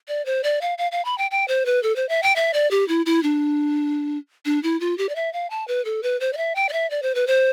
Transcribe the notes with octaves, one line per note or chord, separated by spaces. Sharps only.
D5
C5
D5
F5
F5
F5
B5
G5
G5
C5
B4
A4
C5
E5
G5
E5
D5
G4
E4
E4
D4
D4
E4
F4
G4
D5
E5
F5
A5
B4
A4
B4
C5
D5
E5
G5
D5
E5
D5
C5
B4
C5